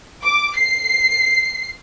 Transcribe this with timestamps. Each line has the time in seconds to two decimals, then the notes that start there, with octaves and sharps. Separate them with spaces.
0.24 D6
0.57 C7